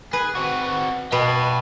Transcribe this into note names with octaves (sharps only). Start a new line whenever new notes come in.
G#4 B4
C4 F#4
B2 B3 G5 A5